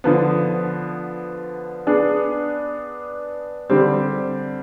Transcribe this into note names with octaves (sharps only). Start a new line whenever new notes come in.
D3 F3 B3
B3 D4 G#4
D3 G3 C4 G4